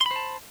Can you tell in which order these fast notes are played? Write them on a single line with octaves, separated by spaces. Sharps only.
C6 B5 C5 A5